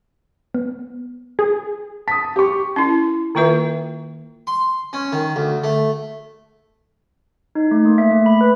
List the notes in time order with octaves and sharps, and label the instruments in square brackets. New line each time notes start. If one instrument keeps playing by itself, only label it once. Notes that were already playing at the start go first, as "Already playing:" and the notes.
[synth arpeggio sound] B3
[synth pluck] G#4
[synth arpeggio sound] A5 [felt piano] D#6 B6
[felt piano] G4 C#6
[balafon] C#4 E4
D#3 A#3 F4 B4 E5
[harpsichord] C6
C#4
D#3
D2
A3
[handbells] D#4
A3
A#3
E5
A3
B5
B4